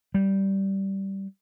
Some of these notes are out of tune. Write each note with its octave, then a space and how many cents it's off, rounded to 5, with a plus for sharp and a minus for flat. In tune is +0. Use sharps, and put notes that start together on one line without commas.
G3 -10